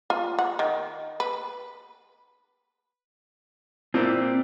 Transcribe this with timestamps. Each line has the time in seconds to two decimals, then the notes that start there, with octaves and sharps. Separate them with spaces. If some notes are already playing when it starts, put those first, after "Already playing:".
0.10 F4
0.39 F#5
0.59 D#3
1.20 B4
3.94 A#2 C4 E4 D5